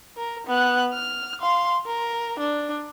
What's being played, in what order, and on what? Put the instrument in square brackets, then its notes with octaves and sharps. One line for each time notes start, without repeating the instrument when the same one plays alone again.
[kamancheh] A#4
B3 F#6
F6
F5 C6
A#4
D4